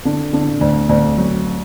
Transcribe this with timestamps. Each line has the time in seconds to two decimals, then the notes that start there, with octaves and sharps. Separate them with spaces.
0.05 D3
0.33 D3
0.61 D2
0.89 D2
1.17 F#3